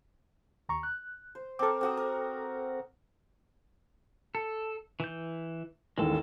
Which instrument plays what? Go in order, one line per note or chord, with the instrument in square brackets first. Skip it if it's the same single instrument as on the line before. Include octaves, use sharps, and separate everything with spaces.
[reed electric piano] D#2 A#5 C#6
F#6
[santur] C5
[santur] C4 A#4 [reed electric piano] A4 G5 D6
[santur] C4 F#4 D#6
A#4
[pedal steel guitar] A4
E3 G6
[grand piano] A1 D#2 G#2 [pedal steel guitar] G#3 A4